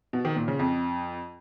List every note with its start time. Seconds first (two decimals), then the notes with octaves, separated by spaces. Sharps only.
0.13 B2
0.25 D#3
0.36 A#2
0.48 C#3
0.59 F2